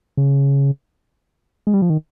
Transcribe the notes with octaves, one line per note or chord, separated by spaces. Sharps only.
C#3
G#3
G3
F3
D#3